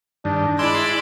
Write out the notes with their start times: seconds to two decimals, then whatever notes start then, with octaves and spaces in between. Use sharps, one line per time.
0.25 G2 D#3 D4
0.59 G#3 E4 D5 G#5 B5 C6 D6 E6